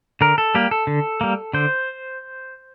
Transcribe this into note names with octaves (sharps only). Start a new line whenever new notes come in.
D3 A#4
A4
G3 A#3 G4
A4
D3
G3 A#3
D3 C5